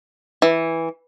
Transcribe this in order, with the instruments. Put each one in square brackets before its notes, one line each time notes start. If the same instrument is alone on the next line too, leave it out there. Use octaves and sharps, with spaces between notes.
[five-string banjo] E3